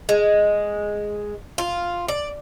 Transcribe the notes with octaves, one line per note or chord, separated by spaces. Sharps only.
G#3
F4
D5